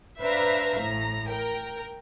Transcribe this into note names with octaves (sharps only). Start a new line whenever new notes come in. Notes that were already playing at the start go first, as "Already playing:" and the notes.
D4 B4 C5 E5 F5 A#5
A1 A2 A#5
A#4 G5